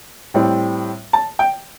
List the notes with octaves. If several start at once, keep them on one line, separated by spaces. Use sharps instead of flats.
A2 G3 C4
A5
G5